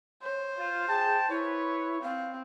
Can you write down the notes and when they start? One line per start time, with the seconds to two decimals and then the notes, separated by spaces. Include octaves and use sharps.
0.22 C5 C#5
0.58 F4
0.88 G#4 G5 A5
1.29 E4 B4 C#5
2.02 C4 F5